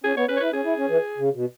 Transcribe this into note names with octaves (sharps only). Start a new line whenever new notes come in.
C#4 G#4
B3 C#5
C#4 B4
C#5
E4 B4
C#4 G#4
E4
C#4
E3
C#3
B2